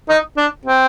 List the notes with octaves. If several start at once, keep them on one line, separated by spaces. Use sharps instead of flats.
D#4
D4
C4